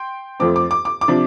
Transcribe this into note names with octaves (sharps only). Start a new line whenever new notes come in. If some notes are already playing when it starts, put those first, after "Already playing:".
Already playing: G5 C6
F2 F3 A3 C4 D6
D6
D6
D6
D6
C3 F3 D4